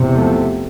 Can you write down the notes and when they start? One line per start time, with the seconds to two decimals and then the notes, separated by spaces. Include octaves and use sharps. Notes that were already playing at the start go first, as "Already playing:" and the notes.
Already playing: E2 C3
0.16 F3 A3